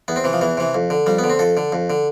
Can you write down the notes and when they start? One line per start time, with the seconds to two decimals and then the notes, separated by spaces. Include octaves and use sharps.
0.08 E2 B3
0.16 C4
0.24 C3 E3
0.33 F3
0.41 E2 E3
0.57 C3 E3
0.75 F2
0.90 D3
1.06 F2 G3
1.19 B3
1.24 D3
1.29 C4
1.39 F2 A4
1.57 D3
1.72 F2
1.90 D3